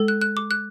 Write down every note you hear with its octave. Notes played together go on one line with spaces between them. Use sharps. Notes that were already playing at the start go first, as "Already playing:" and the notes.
Already playing: G#3 A4
F#6
F#6
D6
F#6